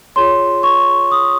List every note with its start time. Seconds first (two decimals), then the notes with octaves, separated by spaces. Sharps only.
0.16 F4 G#4 C#5 C6
0.63 C#6
1.11 D#6